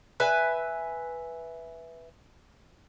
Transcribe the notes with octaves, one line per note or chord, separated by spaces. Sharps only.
B4 E5 G#5